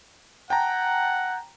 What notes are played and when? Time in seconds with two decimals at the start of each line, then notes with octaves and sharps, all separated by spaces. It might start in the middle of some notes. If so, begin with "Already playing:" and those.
0.50 F#5 G5 A5 A#5